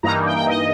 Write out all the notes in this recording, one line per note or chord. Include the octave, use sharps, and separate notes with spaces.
G2 E3 A#3 D#4 A#5
G5
G5
D#5